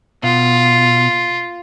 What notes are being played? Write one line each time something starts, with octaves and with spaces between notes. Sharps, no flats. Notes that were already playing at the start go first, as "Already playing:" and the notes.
B2 F4